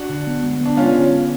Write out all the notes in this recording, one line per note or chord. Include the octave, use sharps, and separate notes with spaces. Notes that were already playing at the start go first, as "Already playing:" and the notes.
Already playing: D4 F#4
D3
B3
G#3
B3 D4
G#3 C#4 F4
D3
G#3